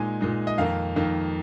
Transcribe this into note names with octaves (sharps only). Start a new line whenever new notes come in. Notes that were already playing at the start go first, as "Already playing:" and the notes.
Already playing: A#2 G#3 D#4 G#5
A#2 G#3 D#4
D#5
F2 D#3 A#3 D#4 F5
F2 D#3 A#3 D#4